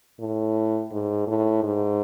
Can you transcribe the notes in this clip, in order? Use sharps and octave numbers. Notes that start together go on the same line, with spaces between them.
A2
G#2
A2
G#2